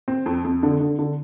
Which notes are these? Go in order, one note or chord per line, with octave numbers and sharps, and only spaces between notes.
C4
F2
F2
D3
D3
D3